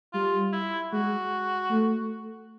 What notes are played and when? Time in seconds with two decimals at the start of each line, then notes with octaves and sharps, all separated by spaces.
0.13 G3 F4
0.52 E4
0.93 G#3 F#4
1.71 A3